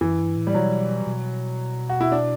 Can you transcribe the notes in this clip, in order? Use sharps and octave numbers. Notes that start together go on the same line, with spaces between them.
F#2 E3
G2
A2
G3
B2 F#3
B2
F#4
E4
D4